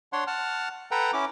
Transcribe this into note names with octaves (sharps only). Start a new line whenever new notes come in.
D4 C#5 F#5 C6
F#5 A5 F6
A4 B4 F#5 G5 A#5
C#4 E4 D6